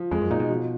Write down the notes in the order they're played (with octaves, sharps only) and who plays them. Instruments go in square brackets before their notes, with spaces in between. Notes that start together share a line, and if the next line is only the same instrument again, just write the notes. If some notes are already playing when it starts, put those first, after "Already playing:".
Already playing: [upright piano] F3
[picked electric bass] F2 [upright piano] G#3
[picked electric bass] F#2
[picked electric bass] A#2 [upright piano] D#4
[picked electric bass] B2
[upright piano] F3